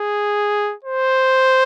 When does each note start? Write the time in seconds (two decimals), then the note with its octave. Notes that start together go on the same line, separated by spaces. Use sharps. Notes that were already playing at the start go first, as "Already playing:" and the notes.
Already playing: G#4
0.84 C5